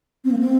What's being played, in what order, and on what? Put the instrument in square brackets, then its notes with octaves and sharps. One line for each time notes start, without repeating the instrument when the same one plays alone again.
[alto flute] C4
A#3
C4